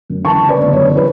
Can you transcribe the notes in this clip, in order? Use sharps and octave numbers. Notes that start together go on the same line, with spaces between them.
F#2
E3 A5 C#6
C#3
B4 D5
G1
F#2 C#5
E3
B4